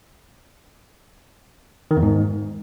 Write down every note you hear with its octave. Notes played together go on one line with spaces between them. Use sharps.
D#3
E2
G#2